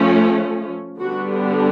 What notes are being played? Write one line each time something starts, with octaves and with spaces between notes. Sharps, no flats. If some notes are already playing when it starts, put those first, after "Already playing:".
Already playing: F3 A3 C#4
D3 G3 B3 D4 F#4